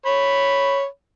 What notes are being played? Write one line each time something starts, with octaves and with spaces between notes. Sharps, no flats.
C#5 B5